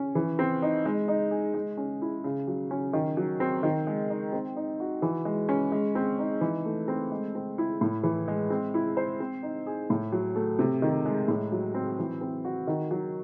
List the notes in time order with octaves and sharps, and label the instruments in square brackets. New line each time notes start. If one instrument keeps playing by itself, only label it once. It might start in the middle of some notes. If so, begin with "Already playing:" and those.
Already playing: [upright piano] C#4
E3
C4
D#4
G#3
D#4
G#4
G#3
C#4
E4
C#3
F#3
C#4
D#3
F#3
C4
D#3
G#3
D#4
C4
D#4
F#4
E3
G#3
C#4
G#3
C4
D#4
E3
A3
C4
G#3
C4
E4
A2
E3
G#3
C4
E4
C5
C4
D#4
G#4
A2
F#3
A3
C3
D#3
G#3
A2
F#3
C4
E3
C4
F#4
D#3
F#3